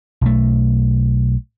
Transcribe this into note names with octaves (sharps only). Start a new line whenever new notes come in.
B1 A3